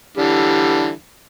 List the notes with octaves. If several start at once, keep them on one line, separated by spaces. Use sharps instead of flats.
D3 E3 G3